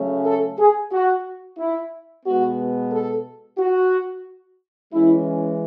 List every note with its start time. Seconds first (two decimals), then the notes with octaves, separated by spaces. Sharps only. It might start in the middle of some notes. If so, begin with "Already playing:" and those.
Already playing: C#3 F#3 A3 C#4
0.25 A4
0.58 G#4
0.91 F#4
1.58 E4
2.25 B2 G#3 B3 F#4
2.92 A4
3.58 F#4
4.92 E3 G#3 C#4 E4